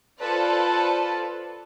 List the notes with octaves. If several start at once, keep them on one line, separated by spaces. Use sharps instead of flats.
F4 A4 B4 C5 D5